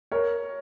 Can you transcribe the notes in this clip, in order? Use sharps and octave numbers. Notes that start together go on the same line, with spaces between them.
A#4 C#5